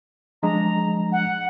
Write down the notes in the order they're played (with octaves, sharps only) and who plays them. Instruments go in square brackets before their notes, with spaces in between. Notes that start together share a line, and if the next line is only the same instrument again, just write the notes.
[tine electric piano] F3 G#3 D4 [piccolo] A#5
[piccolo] F#5